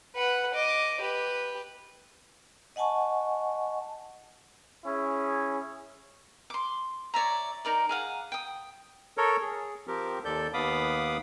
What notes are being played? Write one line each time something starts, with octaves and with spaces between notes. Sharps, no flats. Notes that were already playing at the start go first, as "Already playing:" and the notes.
B4 F#5
D#5 D6
G4 B4
D#5 F#5 G#5 A5 C#6
C#4 E4 G#4
C6 D6
C#5 D5 E5 A#5
D#4 A#4 D5
G#4 F5 F#5
G5 D#6
A4 A#4 C#5
G#4
F3 C4 G4 A#4
D#2 A4 D5 G6
D#2 B3 F5 B5 D6 D#6